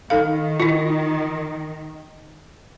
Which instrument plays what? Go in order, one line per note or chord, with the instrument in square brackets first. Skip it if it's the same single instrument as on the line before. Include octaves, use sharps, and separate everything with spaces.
[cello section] D#3 [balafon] D#4 A4 F5
[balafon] E4 F4